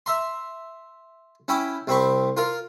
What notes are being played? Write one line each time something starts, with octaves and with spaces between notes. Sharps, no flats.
E5 A#5 C6
C#4 E4 G5 B5
C2 C4 B5 C#6
F4 A#4 F5